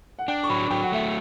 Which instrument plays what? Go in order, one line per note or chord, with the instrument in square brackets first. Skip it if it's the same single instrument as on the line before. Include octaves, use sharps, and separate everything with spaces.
[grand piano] F#5
[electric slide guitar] D4 [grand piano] G5
[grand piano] C#6
[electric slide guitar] F#3 [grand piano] B5
[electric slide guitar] F#3 [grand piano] G5
[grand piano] F#5
[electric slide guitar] A3 [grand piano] E5